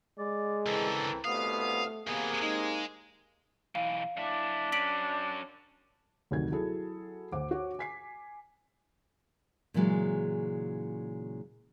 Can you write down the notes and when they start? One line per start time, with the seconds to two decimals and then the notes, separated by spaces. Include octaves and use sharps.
0.18 G#3 D5
0.66 C#2 D3 E3 C4 A4 A#4
1.25 C2 B2 A3 B3 F5 D#6
2.07 C3 D#3 A#3 B3 G#4
2.42 G#3 D#4
3.75 B1 E3 F5
4.17 F#2 D4 E4
4.72 F#3 C#4 B6 D7 F#7
6.31 F1 D2 D#3 F#3 G#6
6.52 F#3 E4 G#4 A4
7.32 D2 C5 F#5 D6
7.51 F#4 C#5
7.79 G#5 B6 C7
9.74 A#2 C#3 E3 F#3 G#3